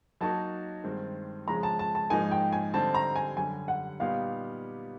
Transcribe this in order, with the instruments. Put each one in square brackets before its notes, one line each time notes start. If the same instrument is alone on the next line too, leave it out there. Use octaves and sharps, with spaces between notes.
[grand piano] F#3 A#3 D#4 F#4 [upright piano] A5
[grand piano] G2 D#3 G#3 C4
[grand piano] F2 C#3 F3 G#3 [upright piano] A#5
[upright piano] A5
A5
A5
[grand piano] G#2 F3 A#3 D#4 [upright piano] G#5
[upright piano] G5
G#5
[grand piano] D3 G3 C4 D#4 [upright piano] A5
[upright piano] A#5
G#5
[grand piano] F#2 D3 G3 [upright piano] G#5
[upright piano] F#5
[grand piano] A#2 G3 B3 D#4 G4 [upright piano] F5